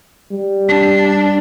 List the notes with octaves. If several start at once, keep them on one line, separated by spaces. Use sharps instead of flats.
G3
D4